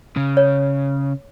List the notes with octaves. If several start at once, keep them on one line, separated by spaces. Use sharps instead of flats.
C#3
C#5